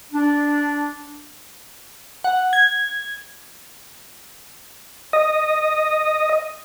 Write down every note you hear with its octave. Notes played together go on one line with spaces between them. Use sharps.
D4
F#5
G#6
D#5